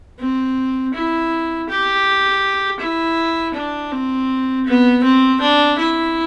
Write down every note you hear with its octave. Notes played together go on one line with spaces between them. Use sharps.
C4
E4
G4
E4
D4
C4
B3
C4
D4
E4